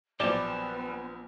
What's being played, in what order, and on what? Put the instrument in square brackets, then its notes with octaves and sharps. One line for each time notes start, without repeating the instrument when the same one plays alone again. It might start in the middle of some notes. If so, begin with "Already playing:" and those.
[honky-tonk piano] A#1 F#3 C5 [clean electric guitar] G3 G5 A5 [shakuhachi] B3 [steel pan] D5